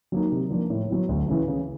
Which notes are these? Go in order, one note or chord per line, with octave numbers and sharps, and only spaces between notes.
F#3 A#3 D#4
C3
F3 A#3 D4
A2
F#3 B3 E4
D2
C#3 E3
C#3